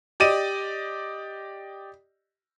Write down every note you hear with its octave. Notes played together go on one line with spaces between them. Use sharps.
G4 D5 D#5 D#7